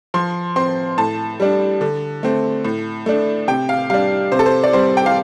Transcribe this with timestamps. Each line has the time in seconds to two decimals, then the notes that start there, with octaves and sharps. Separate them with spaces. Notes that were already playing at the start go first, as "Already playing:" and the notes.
0.14 F3 C6
0.56 C4 C6
0.98 A2 A5
1.40 G3 D4
1.81 D3
2.23 A3 C4
2.65 A2
3.06 A3 D4
3.48 C3 G5
3.69 F5
3.90 G3 D4 F5
4.32 C3 C5
4.39 A4
4.46 C5
4.64 D5
4.73 G3 C4 C5
4.97 G5
5.06 F5